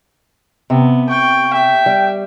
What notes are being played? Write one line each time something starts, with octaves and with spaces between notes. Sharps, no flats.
C3 B3
G5 C#6
E5 G5
G3